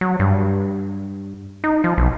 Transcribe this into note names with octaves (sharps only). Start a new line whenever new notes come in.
F#3
G2
D#4
F3
B1